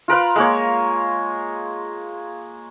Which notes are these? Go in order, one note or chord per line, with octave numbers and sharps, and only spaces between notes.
F4 A#4 B4 F5
G#3 A#3 C#5